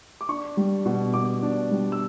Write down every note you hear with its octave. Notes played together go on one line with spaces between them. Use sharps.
D6
D4 C#6
G3
B2
B2 D6
D4
G3
E6